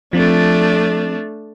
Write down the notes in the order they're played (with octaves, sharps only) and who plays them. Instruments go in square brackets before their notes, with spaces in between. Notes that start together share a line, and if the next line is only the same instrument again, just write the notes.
[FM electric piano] F3 C4 [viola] A3 D4